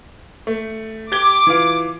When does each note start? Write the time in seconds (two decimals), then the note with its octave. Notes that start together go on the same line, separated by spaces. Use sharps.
0.47 A3
1.12 G4 D6 G#6 G7
1.47 E3 F4